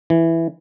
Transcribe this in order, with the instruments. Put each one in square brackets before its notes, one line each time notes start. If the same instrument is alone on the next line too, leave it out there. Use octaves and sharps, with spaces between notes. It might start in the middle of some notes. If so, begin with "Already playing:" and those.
[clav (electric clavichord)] E3